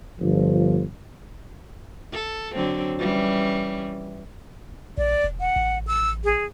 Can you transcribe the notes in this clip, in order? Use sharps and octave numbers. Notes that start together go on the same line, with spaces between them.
G1 F3
A4
D3 F#3 C4
E3 G3 C#4
A#1 D5
E1
F#5
A1
E6
G#4